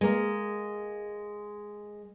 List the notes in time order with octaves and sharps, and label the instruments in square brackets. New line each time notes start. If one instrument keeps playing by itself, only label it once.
[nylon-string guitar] G#3 A#3